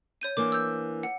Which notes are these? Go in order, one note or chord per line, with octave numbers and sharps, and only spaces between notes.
C#5 G6 D#7
E3 A#3 D4 D6
E6 G6
F#5